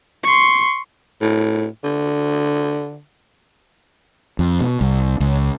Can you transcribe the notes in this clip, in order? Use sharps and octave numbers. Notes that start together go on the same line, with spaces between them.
C6 C#6
A2
D3
F2
B2
C2
C#2